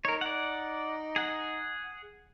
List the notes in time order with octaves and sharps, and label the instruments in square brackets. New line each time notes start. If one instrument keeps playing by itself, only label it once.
[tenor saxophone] D#4 [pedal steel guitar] A#4 C#5
[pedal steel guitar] D5 F#5
G#4 F#5